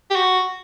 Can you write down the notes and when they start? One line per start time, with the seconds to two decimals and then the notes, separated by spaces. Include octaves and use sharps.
0.10 G4
0.15 F#4